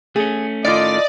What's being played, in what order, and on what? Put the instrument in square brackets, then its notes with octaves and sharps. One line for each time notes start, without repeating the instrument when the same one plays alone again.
[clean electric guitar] A3 C#4 [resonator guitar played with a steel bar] G#4
[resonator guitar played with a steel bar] A2 D#3 F4 [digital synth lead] D5 [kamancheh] D#5